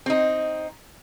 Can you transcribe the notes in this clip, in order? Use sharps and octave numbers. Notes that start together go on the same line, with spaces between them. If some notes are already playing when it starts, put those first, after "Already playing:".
C4 D#4